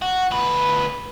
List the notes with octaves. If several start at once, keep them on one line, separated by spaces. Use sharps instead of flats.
F#4
D2 B4